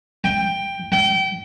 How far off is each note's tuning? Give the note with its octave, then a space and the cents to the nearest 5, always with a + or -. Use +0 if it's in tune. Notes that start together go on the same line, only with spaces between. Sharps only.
G5 +10
G5 -30